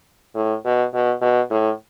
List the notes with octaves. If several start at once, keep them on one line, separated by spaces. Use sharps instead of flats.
A2
B2
B2
B2
A2